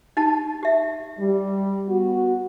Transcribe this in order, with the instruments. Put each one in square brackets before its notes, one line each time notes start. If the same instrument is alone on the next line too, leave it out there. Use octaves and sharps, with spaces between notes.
[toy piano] D#4 G4 A5
G4 E5
[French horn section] G3
B3 F#4